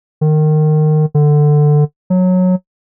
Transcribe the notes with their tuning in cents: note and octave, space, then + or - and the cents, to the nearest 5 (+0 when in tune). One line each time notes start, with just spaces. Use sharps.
D#3 -20
D3 +15
F#3 -15